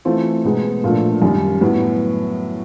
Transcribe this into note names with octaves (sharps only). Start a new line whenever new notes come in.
E3 A3 C4 F4
B2 G#3 B3 D#4 G#4
A#2 F3 A3 D4
F#2 D#3 G3
A2 F#3 B3